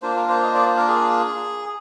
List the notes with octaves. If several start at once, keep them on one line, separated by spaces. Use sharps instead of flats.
A#3 D4 F4 C5
A#4
C5
D#5
D5
C5
A#4
G#4